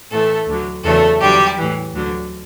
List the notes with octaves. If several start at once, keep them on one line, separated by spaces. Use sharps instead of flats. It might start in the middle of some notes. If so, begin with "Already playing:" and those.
A2 E3 A3 A4
D2 D3 F#3
E2 C#3 F#3 A3 A4
E2 D3 F#3 G3 G4
A2 E3
D2 D3 F#3